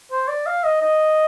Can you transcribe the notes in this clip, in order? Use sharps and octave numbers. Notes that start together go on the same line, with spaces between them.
C5
D5
F5
D#5
D#5